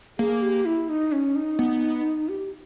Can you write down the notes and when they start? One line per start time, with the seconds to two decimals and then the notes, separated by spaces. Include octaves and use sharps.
0.19 A#3 G#4
0.42 G4
0.65 E4
0.89 D#4
1.12 C#4
1.35 D#4
1.59 B3
2.29 G4